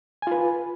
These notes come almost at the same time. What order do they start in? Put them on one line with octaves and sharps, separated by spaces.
G#5 F4 B4